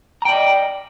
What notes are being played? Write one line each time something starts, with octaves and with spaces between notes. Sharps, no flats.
D5 D#5 G5 A#5